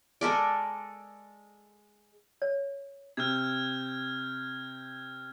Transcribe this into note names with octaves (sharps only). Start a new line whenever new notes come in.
G#3 A4 A#4 D5
C#5
C3 F6 G6 G#6